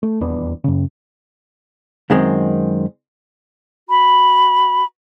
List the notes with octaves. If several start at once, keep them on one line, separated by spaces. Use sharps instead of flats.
A3
D#1 E2 B3 D4
F#2 C#3
F#2 D#3 G#3 C4
F#4 B5